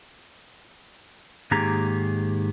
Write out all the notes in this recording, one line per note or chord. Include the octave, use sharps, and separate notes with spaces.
G#2 D#3 A#3 G4 G#4 A#5